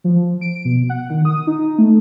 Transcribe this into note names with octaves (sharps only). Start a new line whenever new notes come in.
F3
D7
B2
F#5
D#3
D#6
D#4
A3